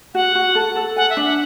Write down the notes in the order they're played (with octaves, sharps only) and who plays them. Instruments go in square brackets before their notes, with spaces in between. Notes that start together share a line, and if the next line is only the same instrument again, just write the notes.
[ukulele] F#4 [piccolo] F#5
[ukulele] F#4
A4
A4
[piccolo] F#5 [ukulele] G#5
[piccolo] E5
[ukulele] D4
[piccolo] F#5